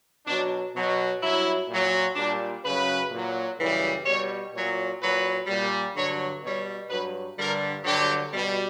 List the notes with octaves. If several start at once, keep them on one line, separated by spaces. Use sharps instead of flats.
B2 F#3 D4
B2 F#3
G2 F#3 E4
A#2 F#3
A#2 G3 D4
F#2 C#3 F#3 B4
A#2 F#3
F#2 C#3 E3 G3
B2 G3 C#5
A#2 F#3 C#5
A#2 F#3 B4
A#2 G3
G2 D3 F#3 C#5
B2 G3 C#5
G2 F#3 B4
G2 D3 G3 A#4
G2 D3 F#3 G4
B2 G3